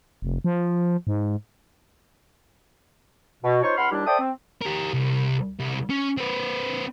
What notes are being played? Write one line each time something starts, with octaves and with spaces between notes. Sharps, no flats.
F1
F3
G#2
B2
D#4 F4 C5 C#5 C#6
C#2 F#5 B5 C6 F6
D#2 G3 D4 E4 G4
A4 C5 D5 E5 G5 D#6
C4
G4 A#4
C2
C2
C#4
C4 B4